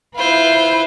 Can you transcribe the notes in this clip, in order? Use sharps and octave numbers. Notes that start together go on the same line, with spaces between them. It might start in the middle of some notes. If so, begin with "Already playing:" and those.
E4 F4 B4 C5